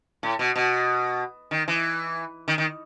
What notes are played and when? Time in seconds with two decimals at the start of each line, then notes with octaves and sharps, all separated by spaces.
0.23 A2
0.39 B2
0.56 B2
1.51 D#3
1.68 E3
2.48 D#3
2.58 D#3